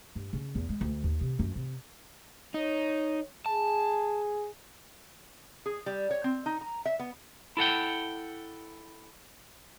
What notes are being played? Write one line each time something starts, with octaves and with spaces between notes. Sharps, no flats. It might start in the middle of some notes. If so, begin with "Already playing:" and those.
G2
C#3
E2
G#3
D2
D#2
C3
F#2
C3
D#4 C#5
G#4 A5
G#4
G3
C#5
C4
D#4
A#5
E5
B3
E4 A4 F#5 G5